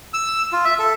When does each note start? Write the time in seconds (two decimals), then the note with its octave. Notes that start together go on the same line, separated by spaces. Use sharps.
0.14 E6
0.53 F4
0.65 E5
0.79 A4